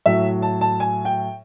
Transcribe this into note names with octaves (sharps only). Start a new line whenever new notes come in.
A2 F#3 E5
A5
A5
G#5
G5